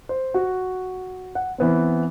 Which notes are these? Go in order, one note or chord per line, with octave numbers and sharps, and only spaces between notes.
C5
F#4
F#5
E3 B3 C4